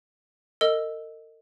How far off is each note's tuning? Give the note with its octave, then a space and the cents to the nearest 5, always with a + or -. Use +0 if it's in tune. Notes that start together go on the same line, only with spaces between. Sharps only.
A#4 -40 D#5 +0 E6 +0